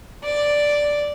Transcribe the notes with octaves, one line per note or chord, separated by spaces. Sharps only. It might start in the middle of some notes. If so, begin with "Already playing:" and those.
D5